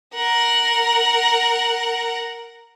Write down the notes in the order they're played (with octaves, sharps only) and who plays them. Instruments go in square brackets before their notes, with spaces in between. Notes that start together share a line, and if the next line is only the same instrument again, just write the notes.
[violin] A#4 F#5